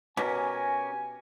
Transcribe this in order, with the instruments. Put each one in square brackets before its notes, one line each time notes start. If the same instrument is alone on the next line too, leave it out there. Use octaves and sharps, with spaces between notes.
[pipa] B2 [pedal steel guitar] C#4 G4 A#4 [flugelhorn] G#5